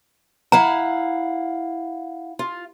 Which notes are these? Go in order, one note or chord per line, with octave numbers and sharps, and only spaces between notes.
E4 F5 F#5 A#5
F4